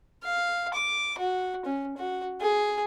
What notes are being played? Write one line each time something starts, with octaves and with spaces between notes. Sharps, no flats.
F5
D6
F#4
C#4
F#4
G#4